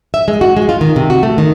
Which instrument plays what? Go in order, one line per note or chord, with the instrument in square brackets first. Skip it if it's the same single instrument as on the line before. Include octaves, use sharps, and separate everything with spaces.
[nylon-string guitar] E5
G#3
F#4
G#3
F4
D#3
C3
F#4
A3
D#3